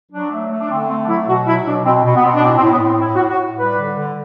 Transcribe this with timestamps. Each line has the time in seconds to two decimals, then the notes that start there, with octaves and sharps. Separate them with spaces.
0.11 F#3 D4
0.31 A3
0.50 A3
0.58 D4
0.70 D3 C4
0.88 A3 C4
1.03 D4
1.07 F#3 E4
1.27 B2 F#4
1.46 F#3 E4
1.65 B2 D4
1.84 B2 C4
2.04 B2
2.16 B3
2.23 B2 C4
2.34 D4
2.43 A2 C4
2.57 C4
2.61 A2
2.72 B3
2.81 A2
2.86 C4
3.00 A2 E4
3.16 F#4
3.20 A2
3.29 F#4
3.39 A2
3.58 G3 B4
3.77 D3
3.97 D3